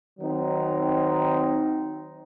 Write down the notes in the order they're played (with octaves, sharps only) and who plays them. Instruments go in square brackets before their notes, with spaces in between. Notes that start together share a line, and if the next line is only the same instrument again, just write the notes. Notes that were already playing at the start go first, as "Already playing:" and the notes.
[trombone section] D#3 F#3 C4 D#4